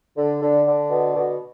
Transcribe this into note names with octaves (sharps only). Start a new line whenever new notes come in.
D3
D3
D3
B2
B2